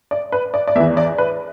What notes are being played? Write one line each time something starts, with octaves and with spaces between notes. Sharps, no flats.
D5
B4
D5
D5
E2 E3 E5
D5
B4